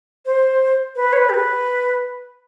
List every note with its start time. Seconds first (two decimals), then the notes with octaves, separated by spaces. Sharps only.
0.26 C5
0.96 B4
1.13 C#5
1.17 B4
1.30 G4
1.34 B4